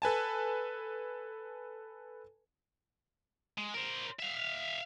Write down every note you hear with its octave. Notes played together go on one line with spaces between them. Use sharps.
A4 B4 G#5 A5
G#3
A#4 C5
E5 F5